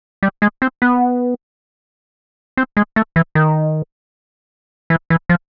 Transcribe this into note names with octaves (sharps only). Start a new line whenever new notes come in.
G3
G#3
C4
B3
C4
G#3
A3
E3
D#3
E3
E3
F3